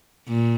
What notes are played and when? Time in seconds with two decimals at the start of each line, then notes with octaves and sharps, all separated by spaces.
0.28 A#2